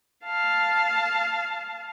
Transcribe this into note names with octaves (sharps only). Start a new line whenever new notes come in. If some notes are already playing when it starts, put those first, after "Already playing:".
F5 A5